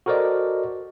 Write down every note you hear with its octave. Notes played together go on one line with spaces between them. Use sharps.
F#4 A4 A#4 C5 D5 D#5